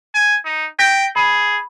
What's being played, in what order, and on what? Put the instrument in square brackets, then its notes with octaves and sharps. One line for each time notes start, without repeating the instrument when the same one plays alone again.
[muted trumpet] G#5
D#4
[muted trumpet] G5 [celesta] G6 A#6 B6
[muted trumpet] G#4 [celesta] B5